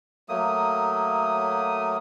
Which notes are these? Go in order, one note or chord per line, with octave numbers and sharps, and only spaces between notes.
F#3 A3 A#3 D#6